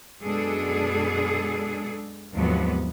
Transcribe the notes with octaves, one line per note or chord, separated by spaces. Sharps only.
F#2 B2 G#3 D4 G#4 A4
D#2 G#2 C3 F3 F#3 B3